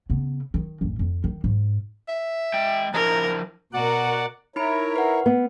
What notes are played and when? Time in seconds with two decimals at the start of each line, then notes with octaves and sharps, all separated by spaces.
0.10 C#3 B3
0.54 D#3
0.81 A1 F#2
0.99 F2
1.24 D#3
1.44 G#2
2.08 E5
2.54 G#3 G5
2.94 F3 D4 E4 A#4 A#5
3.73 B2 F#4 A#4 D5 F#5
4.56 D#4 E4 A#4 C#5 B5 D7
4.96 B4 F#5
5.26 B3